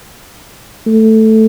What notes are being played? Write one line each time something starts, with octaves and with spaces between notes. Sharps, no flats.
A3